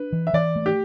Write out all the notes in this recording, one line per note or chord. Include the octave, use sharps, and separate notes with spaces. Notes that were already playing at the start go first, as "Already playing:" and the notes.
Already playing: D4 B4
E3
E5
E3 D5
A3
G4